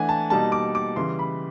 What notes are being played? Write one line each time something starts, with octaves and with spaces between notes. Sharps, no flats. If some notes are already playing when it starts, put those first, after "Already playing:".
Already playing: E3 A3 D4 F#5 G#5
A5
B2 G3 A#3 D#4 A5
D6
D6
C#3 E3 G3 C6
B5